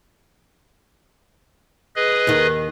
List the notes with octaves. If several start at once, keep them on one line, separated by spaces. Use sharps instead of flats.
G#4 B4 D#5
D#2 D#3